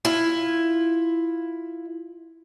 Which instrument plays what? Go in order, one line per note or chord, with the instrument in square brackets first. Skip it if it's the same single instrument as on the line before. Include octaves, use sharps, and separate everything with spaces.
[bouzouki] E4 F4